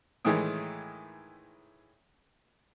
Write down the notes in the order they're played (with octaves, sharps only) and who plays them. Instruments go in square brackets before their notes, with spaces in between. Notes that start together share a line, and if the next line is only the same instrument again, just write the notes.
[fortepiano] A2 D#3 E3 G#3